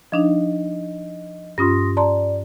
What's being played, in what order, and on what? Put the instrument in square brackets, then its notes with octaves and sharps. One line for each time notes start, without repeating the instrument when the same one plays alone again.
[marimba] F3 D4 D#4 [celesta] D#5
[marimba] G2 C#4 F4 [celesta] C6 D#6 A#6
[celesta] D5 [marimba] A5 A#5 C6